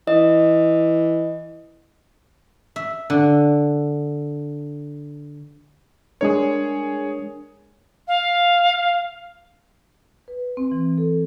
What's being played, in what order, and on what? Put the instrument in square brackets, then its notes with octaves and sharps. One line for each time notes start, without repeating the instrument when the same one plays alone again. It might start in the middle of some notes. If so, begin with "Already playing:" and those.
[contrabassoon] E3 [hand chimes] D#5
[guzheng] E5
D3
[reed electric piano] G#3 D4 A#4 [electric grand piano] G#4 C#5
[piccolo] F5
[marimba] B4
C4
E3
A4